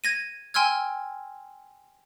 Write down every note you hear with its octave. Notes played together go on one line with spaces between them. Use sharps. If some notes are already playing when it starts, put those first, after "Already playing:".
G#6 A#6 D#7
G5 G#5 C6 E6 F6 G#6